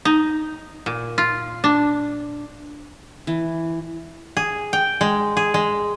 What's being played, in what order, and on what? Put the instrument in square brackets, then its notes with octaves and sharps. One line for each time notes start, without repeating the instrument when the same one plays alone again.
[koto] D#4
A#2
F4
D4
[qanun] E3
[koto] G#4
G5
G#3
G#4
G#3